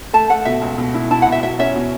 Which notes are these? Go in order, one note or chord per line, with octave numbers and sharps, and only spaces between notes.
A3 A5
A3 F#5
B2 E5
C#2
B2
E4
E4 A5
B2 F#5
E5
F#3 E5
C#4 E5
B2